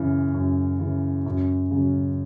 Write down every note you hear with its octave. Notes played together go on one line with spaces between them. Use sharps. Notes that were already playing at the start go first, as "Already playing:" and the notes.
Already playing: F#2 C#3 E3
F#2
C#3 E3
F#2
C#3 F#3